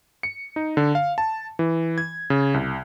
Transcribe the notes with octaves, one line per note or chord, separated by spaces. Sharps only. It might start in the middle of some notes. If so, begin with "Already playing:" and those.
C#7
D#4
D3
F5
A5
E3
G#6
C#3
C2